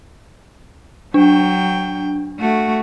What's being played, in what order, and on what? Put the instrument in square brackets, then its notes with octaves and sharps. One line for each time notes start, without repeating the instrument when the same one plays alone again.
[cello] F#3 G5 [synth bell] D4
[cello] A3 F#4